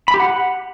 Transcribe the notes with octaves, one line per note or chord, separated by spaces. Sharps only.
B5
G4
F#5